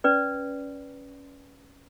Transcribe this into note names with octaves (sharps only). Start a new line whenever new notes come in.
C#4 B4 D5